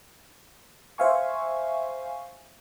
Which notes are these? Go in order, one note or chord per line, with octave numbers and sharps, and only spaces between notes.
C5 E5 F5 G#5 C#6